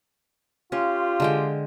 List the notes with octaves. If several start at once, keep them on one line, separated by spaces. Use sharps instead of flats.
C#4 F4 G4
D3 G#3 G5